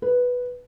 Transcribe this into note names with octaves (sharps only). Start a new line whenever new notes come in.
B4